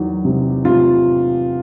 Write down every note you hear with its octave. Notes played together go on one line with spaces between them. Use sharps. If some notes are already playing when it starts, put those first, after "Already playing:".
Already playing: E2 D#3 F#3
C3
C3 F4